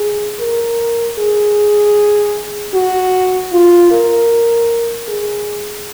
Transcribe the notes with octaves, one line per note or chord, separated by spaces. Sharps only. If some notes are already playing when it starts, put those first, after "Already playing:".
Already playing: G#4
A#4
G#4
F#4
F4
A#4
G#4